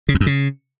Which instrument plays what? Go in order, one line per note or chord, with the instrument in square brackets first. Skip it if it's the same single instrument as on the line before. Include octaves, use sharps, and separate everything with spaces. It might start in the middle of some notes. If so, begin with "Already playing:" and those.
[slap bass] C#3
E2
F#2
C#3